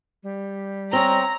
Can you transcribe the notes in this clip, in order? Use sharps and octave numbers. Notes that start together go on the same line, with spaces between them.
G3
C4 C#4 A#5